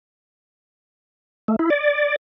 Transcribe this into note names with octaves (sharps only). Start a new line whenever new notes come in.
A3
E4
D5